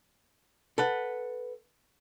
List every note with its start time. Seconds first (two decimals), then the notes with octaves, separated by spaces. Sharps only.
0.78 A4 B4 F#5